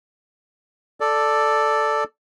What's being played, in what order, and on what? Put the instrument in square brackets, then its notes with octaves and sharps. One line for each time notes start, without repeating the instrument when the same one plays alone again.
[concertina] A4 D5